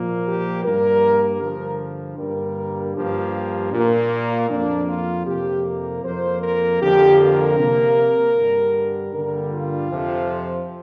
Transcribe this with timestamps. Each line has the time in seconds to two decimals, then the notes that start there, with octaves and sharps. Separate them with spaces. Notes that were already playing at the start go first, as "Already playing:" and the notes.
Already playing: A#2 F3 A#3
0.26 G4
0.64 G2 G3 A#3 A#4
1.41 G2 D3 F3 A#4
2.18 G2 D3 G3 A#3 A#4
2.95 G2 F3 A#3 G4
3.73 A#2 A#3
4.49 F2 F3 A#3 D4
4.89 F4
5.27 F2 C3 A#3 G4
5.66 A#4
6.04 F2 F3 A#3 C5
6.42 A#4
6.81 F2 D3 F3 A#3 G4
7.20 A#4
7.59 C3 A#3
8.36 G2 D3 G3
9.13 G2 D3 G3 A#3 A#4
9.52 F4
9.90 F2 C3 F3